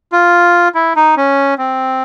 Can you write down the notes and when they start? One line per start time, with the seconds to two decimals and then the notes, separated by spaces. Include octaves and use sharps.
0.12 F4
0.75 E4
0.96 D#4
1.17 C#4
1.58 C4